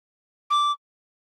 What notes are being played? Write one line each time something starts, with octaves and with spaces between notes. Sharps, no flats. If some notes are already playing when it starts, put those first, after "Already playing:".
D6